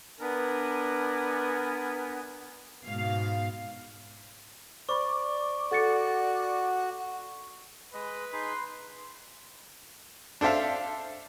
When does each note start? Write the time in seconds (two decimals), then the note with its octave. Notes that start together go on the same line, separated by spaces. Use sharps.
0.19 B3 D4 A#4 B4 G#5
2.86 G#2 B2 F5
4.89 C5 D5 B5 C#6
5.71 F#4 A4 A6 C#7
7.94 G#3 B4 D#5
8.33 D#4 G#4 B5 C6
10.41 D4 A4 C5 E5 F5